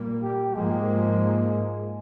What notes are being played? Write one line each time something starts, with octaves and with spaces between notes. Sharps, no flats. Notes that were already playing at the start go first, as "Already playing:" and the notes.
Already playing: A#2 G3 A#3
G4
G#2 F3 G#3 A#3